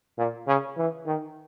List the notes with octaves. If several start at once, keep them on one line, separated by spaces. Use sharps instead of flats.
A#2
C#3
E3
D#3